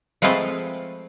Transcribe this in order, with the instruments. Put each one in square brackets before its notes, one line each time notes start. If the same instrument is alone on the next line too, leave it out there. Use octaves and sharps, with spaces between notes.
[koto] F3 G#3 A3 C4 B4 C5